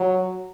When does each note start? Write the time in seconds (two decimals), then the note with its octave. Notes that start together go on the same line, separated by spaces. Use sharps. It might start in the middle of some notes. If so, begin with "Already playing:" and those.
Already playing: F#3